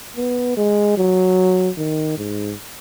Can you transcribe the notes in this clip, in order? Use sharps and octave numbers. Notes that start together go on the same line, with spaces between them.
B3
G#3
F#3
D#3
G#2